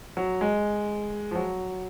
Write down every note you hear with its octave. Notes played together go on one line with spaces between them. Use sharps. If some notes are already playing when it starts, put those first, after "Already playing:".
F#3
G#3
F3
F#3